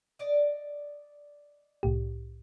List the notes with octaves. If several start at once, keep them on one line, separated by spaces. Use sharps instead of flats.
D5 D#5
C2 A2 G4